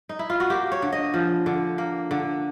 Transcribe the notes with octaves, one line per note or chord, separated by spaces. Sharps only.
D#4
E4
F4
F#4
A#3 G4
C#5
D3
D#5
F3
D3
A#3
D3